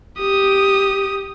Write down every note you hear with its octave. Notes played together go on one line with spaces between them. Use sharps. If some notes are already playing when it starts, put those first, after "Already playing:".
G4 D#6